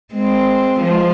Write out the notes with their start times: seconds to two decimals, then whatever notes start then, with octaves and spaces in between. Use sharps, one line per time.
0.14 G#3 C4
0.82 F3 G#3